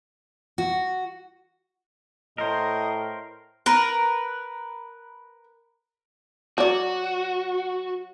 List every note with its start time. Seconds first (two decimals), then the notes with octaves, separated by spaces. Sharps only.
0.58 F#4
2.38 A2 A#4 C5 D#5
3.66 A#4 B4
6.58 F#3 F#4 D5